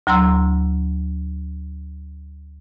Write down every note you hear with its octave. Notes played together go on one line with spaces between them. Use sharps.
D2 F#3 A#5 C6 E6